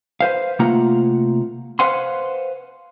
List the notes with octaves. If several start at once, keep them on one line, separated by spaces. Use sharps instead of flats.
B4 C5 F5
C3 A3 A#3 F4 F#5 A#5
B4 C5 F5 F#5 G#5 C6